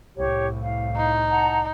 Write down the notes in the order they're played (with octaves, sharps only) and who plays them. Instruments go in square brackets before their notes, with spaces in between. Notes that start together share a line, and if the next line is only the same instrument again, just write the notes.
[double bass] C2 A2 [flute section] G4 C#5
[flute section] F5
[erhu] D#4
[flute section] F#5 A5 A#5